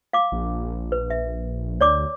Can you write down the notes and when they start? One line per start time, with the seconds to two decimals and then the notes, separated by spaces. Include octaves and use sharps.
0.13 F5 D6
0.32 A#1
0.92 B4
1.10 E5
1.81 D2 C#5 D5 D6